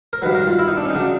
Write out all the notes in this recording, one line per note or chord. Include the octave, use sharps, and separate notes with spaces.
A#4
G2 D#3 F#3 B4
A#4
F4
E4
D#4
D4
C#4
D#4
C#3 F#3 D4